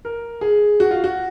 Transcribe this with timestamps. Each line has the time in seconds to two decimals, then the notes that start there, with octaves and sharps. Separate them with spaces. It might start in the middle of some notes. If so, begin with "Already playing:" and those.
0.05 A#4
0.41 G#4
0.80 F#4
0.91 F4
1.04 F#4